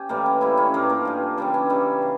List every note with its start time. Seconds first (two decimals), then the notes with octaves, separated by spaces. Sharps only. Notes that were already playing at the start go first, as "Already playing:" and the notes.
Already playing: C#4 G4
0.09 A2 E3 G3 A#3
0.26 C#4
0.41 A2 E3 G3 E4
0.57 C#4
0.74 G2 F3 A#3
0.90 A#3
1.05 G2 F3
1.37 C#3 E3 G3 D4
1.54 C#4
1.70 C#3 E3 G3
2.02 C#3